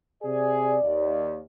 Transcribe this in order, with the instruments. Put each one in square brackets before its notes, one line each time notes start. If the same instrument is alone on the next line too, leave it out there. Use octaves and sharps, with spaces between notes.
[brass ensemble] C3 G#4 [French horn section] D5
[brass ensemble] D#2